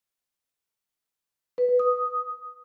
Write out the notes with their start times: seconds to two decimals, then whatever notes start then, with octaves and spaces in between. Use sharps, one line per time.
1.58 B4
1.69 B4
1.79 D#6